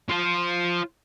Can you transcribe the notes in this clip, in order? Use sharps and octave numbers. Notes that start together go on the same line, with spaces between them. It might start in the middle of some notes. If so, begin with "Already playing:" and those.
F4 C5